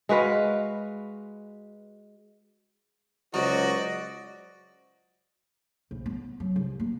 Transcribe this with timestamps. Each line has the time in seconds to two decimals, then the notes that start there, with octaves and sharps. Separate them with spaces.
0.09 G#3 F#4 B4 F5
3.34 C#2 F#3 F#4 C5 D5 D#5
5.91 A#1
6.06 B3
6.40 F#3
6.56 C2
6.80 A#3